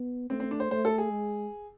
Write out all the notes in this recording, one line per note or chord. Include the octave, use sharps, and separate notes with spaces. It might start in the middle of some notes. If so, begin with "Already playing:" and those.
Already playing: B3
A3 C4
C4
D4
C5
A3 C5
A4
G#4
G#3